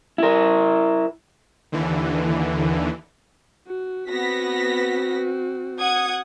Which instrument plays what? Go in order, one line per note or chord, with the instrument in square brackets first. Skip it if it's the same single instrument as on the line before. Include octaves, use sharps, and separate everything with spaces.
[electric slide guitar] E4 A#4
[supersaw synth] D#2 D3 E3
[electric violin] F#4
[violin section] B3 A#6 B6 [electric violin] C4 F#4
[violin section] F#5 D#6 G#6